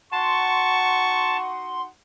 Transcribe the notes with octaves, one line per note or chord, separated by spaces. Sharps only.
D#4 F#4 F#5 A5 C6 C#6